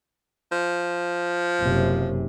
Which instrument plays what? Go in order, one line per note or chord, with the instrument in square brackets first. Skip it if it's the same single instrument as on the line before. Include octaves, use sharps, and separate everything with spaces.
[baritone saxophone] F3
[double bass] F#1 C3